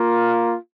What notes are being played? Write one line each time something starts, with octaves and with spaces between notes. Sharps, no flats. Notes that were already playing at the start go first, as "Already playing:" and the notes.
Already playing: A#3 F4